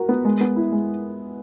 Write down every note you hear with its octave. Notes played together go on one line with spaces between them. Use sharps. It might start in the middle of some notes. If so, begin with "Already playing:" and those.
Already playing: F#4 A#4
B3
G#3
B3
E4
G#3